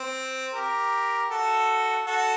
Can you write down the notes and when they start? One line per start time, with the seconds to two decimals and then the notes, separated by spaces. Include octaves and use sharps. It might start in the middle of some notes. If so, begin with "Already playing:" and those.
Already playing: C4
0.54 G4 A#4
1.30 F#4 A4
2.07 F#4 A4